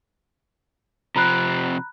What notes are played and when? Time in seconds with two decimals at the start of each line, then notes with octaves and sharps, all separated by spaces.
1.16 C3 F3 C4 A#5 B5 F#6